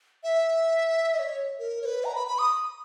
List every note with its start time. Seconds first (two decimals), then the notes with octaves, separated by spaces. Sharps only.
0.24 E5
1.14 D#5
1.19 C#5
1.59 A#4
1.82 C#5
1.86 B4
2.05 A#5
2.15 B5
2.27 B5
2.39 D#6